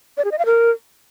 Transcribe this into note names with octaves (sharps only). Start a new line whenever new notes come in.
D5
G#4
D#5
F5
A#4